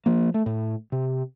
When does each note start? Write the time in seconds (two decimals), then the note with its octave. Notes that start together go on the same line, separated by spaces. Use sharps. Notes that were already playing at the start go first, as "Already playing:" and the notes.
0.06 F3 A#3
0.34 A3
0.46 A2
0.92 C3